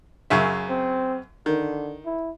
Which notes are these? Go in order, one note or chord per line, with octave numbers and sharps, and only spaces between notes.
F#2 C#3 E5
C4
D3 D#3
E4